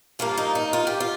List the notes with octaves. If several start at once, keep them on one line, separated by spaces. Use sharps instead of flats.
G2 F3 A#3 F4
D#4
D#4
F4
G4
F4